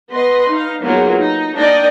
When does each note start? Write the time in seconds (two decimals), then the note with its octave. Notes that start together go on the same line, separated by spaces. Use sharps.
0.11 B3 B4 D#5 C6
0.49 D#4 F5
0.82 F#3 A#3 B3 D#4 F4 G#4
1.17 D#4
1.56 A#3 D4 D#4 D5 D#5 G5